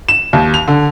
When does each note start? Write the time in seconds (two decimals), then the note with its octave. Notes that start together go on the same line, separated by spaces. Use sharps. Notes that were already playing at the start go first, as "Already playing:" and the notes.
0.09 E7
0.33 D#2
0.54 F7
0.68 D3